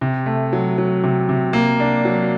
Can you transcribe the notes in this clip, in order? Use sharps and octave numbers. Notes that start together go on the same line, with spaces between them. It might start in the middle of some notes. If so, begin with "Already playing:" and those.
C3
A3
F#3
F#3
C3
C3
A#3
D4
F#3